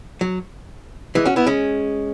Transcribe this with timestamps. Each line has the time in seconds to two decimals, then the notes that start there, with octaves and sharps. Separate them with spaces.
0.21 F#3
1.15 E3 G#3
1.25 C#4 F#4
1.36 B3 E4
1.47 G#3 C#4